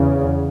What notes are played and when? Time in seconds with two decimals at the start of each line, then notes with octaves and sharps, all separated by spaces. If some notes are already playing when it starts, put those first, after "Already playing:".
Already playing: E2 C#3